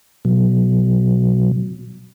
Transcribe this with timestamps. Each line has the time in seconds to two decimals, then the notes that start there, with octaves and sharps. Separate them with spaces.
0.25 B2 F#3